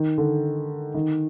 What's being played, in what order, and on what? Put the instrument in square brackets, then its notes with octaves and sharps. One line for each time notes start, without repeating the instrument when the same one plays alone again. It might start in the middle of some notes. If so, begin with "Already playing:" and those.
Already playing: [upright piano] D#3
D3
D#3